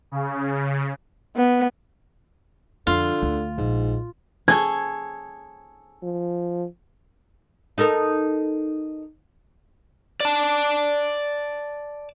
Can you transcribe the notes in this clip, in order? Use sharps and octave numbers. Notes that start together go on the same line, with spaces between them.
C#3
B3
F2 D3 F4
D2
A#1 G#2
G#4 A4 C#5 G#6
F3
D#4 A4 A#4
D5 A5